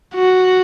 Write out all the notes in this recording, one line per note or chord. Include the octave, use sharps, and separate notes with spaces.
F#4